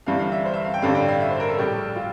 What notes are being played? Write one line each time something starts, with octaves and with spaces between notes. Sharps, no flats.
G1 G2 E3 G3 F5
F5
E5
C5
E5
F5
G5
A1 G2 D3 G3 F5
G5
F5
E5
C5
A#4
A4
A#1 A2 G3 G4
F4